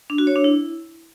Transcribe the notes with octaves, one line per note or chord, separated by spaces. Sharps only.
D4
F#4
C#5
D4
E4